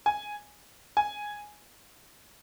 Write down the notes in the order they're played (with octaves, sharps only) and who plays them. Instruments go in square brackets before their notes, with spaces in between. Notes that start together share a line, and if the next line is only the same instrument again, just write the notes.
[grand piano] G#5
G#5